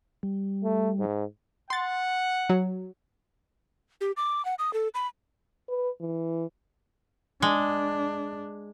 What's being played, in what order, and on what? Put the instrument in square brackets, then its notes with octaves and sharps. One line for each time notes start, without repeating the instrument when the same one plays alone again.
[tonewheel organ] G3
[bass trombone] A3
G#2
[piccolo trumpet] F#5 [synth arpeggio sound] C6 A6
[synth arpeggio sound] F#3
[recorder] G4
D6
F#5
D#6
A4
B5
[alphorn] B4
E3
[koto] G#3 [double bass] D4